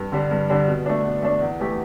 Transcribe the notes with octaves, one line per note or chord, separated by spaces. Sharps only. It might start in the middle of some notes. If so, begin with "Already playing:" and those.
Already playing: G2
D3 G3 D4
G2
D3 G3 D4
B2
A3 D4
B2
A3 D4
E2
E3 A3 G4